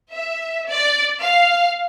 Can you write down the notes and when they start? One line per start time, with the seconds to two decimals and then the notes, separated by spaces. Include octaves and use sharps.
0.11 E5
0.70 D5
1.20 F5